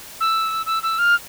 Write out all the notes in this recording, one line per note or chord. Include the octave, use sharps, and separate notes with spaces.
E6
E6
E6
F6